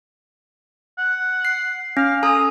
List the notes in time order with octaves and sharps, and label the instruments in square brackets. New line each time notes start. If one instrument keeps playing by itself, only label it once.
[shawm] F#5
[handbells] C7
[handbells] C#4 [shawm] F5
[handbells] A4 G#5 A#5 [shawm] D#6